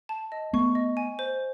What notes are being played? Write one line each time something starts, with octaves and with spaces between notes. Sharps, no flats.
A5
D#5
A3 B3 C#6
D#5
G#5
C5